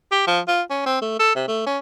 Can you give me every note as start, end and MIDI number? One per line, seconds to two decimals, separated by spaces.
0.12 0.22 67
0.27 0.40 53
0.48 0.62 65
0.70 0.86 61
0.86 0.98 60
1.02 1.16 57
1.19 1.33 69
1.35 1.46 48
1.48 1.65 57
1.67 1.79 61